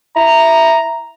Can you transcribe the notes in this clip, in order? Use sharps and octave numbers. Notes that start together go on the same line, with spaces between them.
E4 A#5